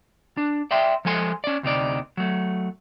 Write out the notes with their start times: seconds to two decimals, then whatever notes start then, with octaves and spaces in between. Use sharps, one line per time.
0.37 D4
0.71 D5 E5 G5 C6
1.05 F3 G#3 A4 G#5 C6
1.44 C#4 D5
1.63 D2 C3 D#4 D5
2.17 F#3 A3